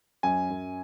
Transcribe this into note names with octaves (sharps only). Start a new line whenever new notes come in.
F#2 G#5
F#2